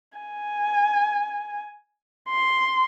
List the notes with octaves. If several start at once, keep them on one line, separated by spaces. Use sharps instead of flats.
G#5
C6